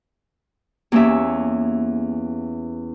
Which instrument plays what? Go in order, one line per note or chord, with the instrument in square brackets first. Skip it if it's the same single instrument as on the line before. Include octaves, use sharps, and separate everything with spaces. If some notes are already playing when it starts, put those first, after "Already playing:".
[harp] E2 A#3 C#4 G4 E5